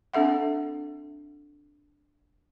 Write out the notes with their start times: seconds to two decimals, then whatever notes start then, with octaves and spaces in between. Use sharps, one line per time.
0.14 C4 D4 A4 E5 F#5